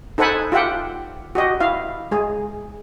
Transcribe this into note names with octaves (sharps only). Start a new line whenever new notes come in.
D#4 A4 C5 F#5 G#5 B5
F4 G4 E5 F#5 G5
F#4 G4 D#5
E4 F5
G#3 G#4